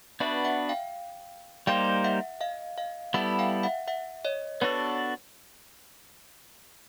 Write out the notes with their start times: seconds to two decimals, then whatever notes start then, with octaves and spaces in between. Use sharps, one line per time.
0.20 B3 D4 F#4 B4 D5 E5
0.45 E5 F#5
0.69 F5 G5
1.67 G3 A#3 D#4 G4 C5 F5 G5
2.04 E5 F#5
2.41 D#5 F5
2.78 D#5 F5
3.14 G3 B3 E4 A4 E5 F#5
3.39 F5 G5
3.63 E5 F#5
3.88 E5 F#5
4.25 C#5 D#5
4.61 B3 D4 F#4 A4 B4 C#5